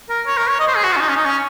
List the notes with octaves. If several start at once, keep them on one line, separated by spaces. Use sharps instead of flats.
A#4
C#5
A#4
C#5
D#5
C5
G#4
F#4
F4
C#4
D#4
C#4
D#4
C#4